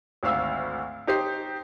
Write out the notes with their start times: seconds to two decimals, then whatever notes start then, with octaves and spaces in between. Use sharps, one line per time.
0.23 G#1 D2 F5 E6
1.07 D#4 G4 C5 C7